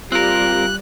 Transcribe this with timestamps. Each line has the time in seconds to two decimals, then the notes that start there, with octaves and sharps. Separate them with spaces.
0.12 G3 C4 F4 A#4 F#6